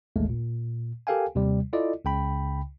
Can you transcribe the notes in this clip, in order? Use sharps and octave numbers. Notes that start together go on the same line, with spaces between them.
A1 D#2 G#3 A3
A#2
G4 A4 A#4 F5 G5 G#5
D#2 C3 G3
E4 F4 A4 D5 D#5
C#2 C#3 G5 B5